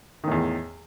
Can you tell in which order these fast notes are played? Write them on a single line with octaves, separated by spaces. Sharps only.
D#3 A2 E2